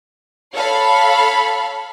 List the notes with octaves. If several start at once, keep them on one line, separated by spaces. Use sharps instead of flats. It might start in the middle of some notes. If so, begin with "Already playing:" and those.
A4 C#5 F5 B5